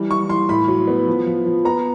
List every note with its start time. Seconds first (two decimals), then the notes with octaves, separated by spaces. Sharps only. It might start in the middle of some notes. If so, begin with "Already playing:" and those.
Already playing: E3 G3
0.11 E3 C#6
0.30 E3 C6
0.49 A2 B5
0.68 F#3
0.88 B3
1.07 F3
1.26 F3
1.46 F3
1.65 B3 A#5